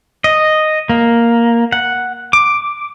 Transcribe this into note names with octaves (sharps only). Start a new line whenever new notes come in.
D#5
A#3
F#5
D6